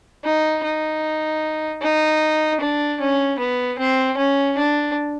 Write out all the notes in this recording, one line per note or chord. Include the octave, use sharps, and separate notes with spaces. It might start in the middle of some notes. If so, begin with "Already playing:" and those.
D#4
D#4
D#4
D4
C#4
B3
C4
C#4
D4